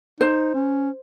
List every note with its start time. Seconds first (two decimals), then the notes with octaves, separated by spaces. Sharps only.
0.20 D#4 C5
0.54 C#4